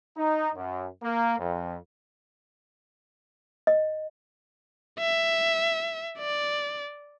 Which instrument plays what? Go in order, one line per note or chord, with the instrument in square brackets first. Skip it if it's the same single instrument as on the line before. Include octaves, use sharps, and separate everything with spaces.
[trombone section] D#4
F#2
A#3
F2
[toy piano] D#5
[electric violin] E5
D5